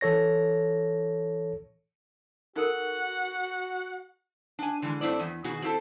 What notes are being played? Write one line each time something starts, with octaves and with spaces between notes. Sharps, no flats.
E3 A4 C#5 A#6
D#4 F#4 A4 A#4 F#5
D4 G#5
D3 E3 G#3
G2 A3 C4 E4 D5
E2
B2 D#3 F#4 G#4
C4 E4 A4